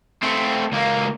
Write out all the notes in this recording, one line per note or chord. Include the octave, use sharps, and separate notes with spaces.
A3 C4
C#2 A#3